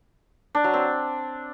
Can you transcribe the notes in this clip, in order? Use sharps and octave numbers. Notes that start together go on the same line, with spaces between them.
D4
F#3
C4